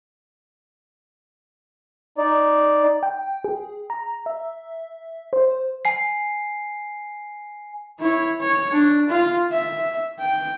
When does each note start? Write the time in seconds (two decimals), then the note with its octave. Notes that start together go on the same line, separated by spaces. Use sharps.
2.18 D#4 D5
3.03 G5
3.44 G#4
3.90 A#5
4.26 E5
5.33 C5
5.85 G#5 C7
7.99 E4 C#5
8.42 C#5
8.72 D4
9.09 F4 F5
9.52 E5
10.20 G5